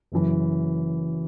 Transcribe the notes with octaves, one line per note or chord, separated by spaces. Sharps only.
F#1 F#2 E3